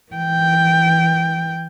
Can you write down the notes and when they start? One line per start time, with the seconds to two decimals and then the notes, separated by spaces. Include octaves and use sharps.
0.13 E3 G5